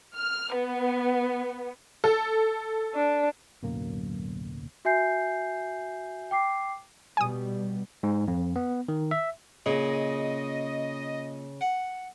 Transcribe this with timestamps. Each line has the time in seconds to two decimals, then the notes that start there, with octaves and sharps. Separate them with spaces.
0.16 F6
0.54 B3
2.04 A4
2.95 D4
3.63 D1 B1 F#2 A#3
4.85 F#4 E5 G#5 G6 C7
6.31 G5 D6 C7
7.17 B2 G3 G#5 D#6
8.03 G#2
8.28 F2
8.56 B3
8.88 D#3
9.11 E5
9.66 A#2 C#3 D#5
11.61 F#5